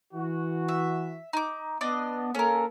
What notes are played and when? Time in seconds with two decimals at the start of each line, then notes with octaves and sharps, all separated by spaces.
0.14 E3 F#4
0.69 E5
1.33 D#4 D6
1.81 B3 D4 D5 D#5
2.35 A#3 C#4 A4 A#4